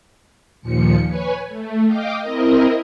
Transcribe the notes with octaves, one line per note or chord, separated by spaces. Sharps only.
D#2 A#2 F3 C#7
B4 C#5 G#5
A3
D#5 F5 G5 D6
C4 E4 A#4 D#5